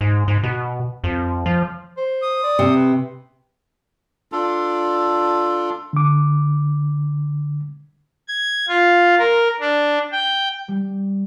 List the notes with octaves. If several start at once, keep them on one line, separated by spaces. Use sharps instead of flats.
G#2
G#2
B2
F2
F3
C5
D#6
D5
C3
B4
D4 F4 A4
D3 D6
G#6
F4
A#4
D4
G5
G3